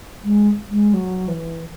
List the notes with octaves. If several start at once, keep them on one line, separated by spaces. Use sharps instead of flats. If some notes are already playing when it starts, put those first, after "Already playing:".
G#3
G#3
F#3
E3